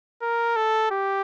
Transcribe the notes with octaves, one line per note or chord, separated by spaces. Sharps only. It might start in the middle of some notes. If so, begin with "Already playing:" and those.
A#4
A4
G4